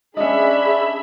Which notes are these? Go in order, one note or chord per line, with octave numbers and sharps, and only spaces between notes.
C#4 D4 G#4 D#5 E5 B5